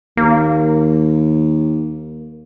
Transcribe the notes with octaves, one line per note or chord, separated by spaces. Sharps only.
D#2 A#3